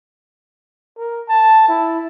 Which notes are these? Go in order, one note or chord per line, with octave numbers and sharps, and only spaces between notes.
A#4
A5
E4